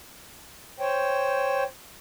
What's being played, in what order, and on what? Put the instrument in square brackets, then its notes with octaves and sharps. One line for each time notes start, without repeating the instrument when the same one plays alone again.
[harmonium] C5 C#5 G5